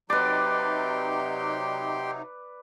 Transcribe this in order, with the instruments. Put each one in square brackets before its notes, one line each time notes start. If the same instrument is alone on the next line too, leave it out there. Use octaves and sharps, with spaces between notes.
[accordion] C3 F#3 D#4 [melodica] G4 G5 C6 [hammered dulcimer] B4 D5